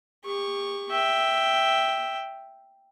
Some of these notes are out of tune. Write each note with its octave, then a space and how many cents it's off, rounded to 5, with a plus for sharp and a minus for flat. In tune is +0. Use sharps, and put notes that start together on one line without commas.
G4 +35 C#6 +0
E5 +0 G5 +0